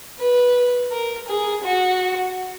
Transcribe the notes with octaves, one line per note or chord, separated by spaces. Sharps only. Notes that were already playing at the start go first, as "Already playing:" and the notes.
B4
A#4
G#4
F#4